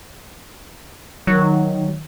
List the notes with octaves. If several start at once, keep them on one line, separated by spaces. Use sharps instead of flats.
D#3 F#3